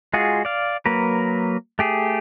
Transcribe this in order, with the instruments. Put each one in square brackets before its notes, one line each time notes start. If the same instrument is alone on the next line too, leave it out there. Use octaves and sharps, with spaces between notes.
[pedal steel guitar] G#3 F4 F#4 G#4
D5 F5
F#3 A#3 A#4 B4
A3 G4 G#4